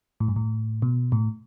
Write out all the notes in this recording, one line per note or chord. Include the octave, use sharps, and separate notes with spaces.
A2
G2
A2
B2
A2